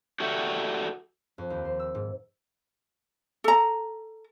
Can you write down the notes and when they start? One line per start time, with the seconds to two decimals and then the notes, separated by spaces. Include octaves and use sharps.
0.20 F#4 G4 A4 D5 E5 F#5
1.38 F2
1.50 D#2
1.65 C5
1.79 E6
1.95 G#2
3.44 A4 A#5